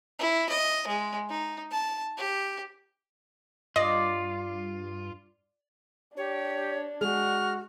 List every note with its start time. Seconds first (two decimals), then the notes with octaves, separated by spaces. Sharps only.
0.19 E4
0.50 D#5
0.87 G#3
1.30 D#4
1.71 A5
2.18 G4
3.76 G2 F4 D5 D#5
6.17 D4 G4 C#5
7.01 G#3 F#4 F6